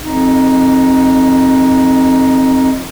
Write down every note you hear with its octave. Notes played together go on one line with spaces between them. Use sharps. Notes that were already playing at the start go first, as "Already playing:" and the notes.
F2 D#4